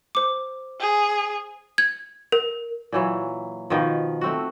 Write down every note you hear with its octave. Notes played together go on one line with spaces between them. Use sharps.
C5 D6
G#4
G#6
A#4
A#2 E3 F#3
B2 D#3 F3
A3 C4 F#4